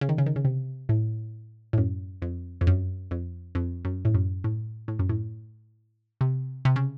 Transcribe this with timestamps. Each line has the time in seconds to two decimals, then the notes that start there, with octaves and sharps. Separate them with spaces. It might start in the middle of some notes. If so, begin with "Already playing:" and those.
0.01 C#3
0.09 D#3
0.18 C#3
0.26 D#3
0.36 C#3
0.45 C3
0.89 A2
1.73 A2
1.78 F#2
2.22 F2
2.61 F2
2.67 F#2
3.11 F2
3.55 F2
3.85 F#2
4.05 A2
4.14 F#2
4.44 A2
4.88 A2
4.99 F#2
5.09 A2
6.21 C3
6.65 C3
6.76 C#3